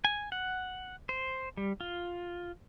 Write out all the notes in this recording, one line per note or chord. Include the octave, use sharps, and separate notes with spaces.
G#5
F#5
C5
G3
F4